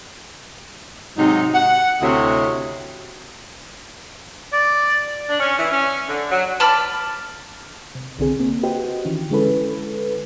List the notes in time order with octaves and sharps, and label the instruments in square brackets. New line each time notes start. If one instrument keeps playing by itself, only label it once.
[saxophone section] G#2 C3 F#3 D#4
F#5
D2 C3 E4 F#4 C#5 D#5
[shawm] D5
[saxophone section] D4
C#4
E3
C#4
D3
F#3
[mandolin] A5 B5 D6 F6
[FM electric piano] C3
B1 D3 C4 G#4
A#3 C4
F#4 G4 B4 C5 D#5 G5
D#3 E3 C#4
D3 G#3 C#4 E4 A4 B4